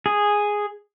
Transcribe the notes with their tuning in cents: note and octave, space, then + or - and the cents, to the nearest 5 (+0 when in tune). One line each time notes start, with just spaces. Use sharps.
G#4 -5